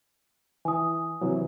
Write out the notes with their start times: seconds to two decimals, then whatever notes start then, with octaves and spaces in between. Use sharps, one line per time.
0.65 E3 G#5 D#6
1.21 C3 E3 F#3